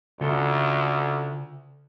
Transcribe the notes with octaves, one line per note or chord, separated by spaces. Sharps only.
D2 C#3 F4 A4